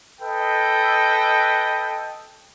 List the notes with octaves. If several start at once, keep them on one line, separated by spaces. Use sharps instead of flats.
A4 B4 D#5 G5